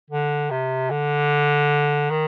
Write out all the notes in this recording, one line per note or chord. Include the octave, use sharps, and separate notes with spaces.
D3
C3
D3
D#3